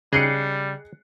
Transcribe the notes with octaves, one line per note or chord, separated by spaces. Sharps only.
C#3 G3 G#4 D#5 G5 F#6 C7 C#7